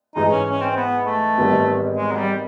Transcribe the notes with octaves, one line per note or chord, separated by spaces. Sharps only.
G#2 E3 G#3 D#4
C#4
C#4
C4
B3
A3
G#1 G#2 D#3 G3 B3
G#3
F#3
G3